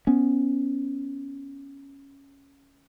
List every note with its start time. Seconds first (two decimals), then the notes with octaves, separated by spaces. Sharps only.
0.07 B3 C#4